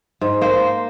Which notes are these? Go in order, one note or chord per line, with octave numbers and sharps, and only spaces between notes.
G#2
A#3 C5